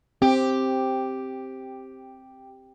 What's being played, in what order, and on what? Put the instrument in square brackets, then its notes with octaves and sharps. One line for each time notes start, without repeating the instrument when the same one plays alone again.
[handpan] C4 [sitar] G4